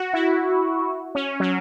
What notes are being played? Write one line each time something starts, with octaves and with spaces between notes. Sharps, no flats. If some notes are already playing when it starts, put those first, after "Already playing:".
Already playing: F#4
E4
C#4
F#3